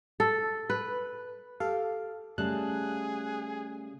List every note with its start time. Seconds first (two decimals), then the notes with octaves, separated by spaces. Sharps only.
0.20 A4
0.70 B4
1.60 G4 A4 F5
2.38 C#3 G3 A3 G#4 A5 F#6